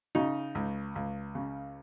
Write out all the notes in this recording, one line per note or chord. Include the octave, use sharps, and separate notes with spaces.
C#3 D#4
C#2
C#2
C#3